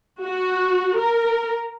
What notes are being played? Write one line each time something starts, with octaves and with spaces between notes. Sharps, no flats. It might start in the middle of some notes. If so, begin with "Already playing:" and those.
F#4
A#4